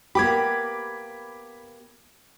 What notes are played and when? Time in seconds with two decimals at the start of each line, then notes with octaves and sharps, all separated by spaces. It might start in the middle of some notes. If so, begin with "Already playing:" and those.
0.15 A#3 B3 G4 B5 D6 G#6